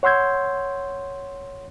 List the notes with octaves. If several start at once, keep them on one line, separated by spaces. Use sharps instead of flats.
C#5 F#5 C6 E6 G6 G#6